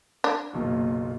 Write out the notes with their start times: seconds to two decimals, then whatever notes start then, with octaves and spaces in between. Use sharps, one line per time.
0.24 D4
0.53 F#1 B1 A#2